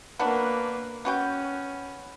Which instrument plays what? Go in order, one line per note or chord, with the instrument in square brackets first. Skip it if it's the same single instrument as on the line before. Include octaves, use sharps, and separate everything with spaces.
[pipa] F#3 B3 D4 [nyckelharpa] A#3 B4
[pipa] B3 F#4 G5 [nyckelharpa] C#4